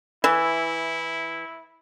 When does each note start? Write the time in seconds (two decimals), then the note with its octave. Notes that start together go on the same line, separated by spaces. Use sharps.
0.24 E3 E4